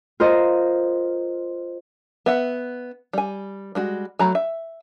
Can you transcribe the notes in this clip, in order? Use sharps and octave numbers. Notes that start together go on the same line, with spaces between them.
F4 A#4 C5 D#5
B3 E5 F#5
G3 G#5
G3 G#3 F#4
F#3 A3 A#5 B5
E5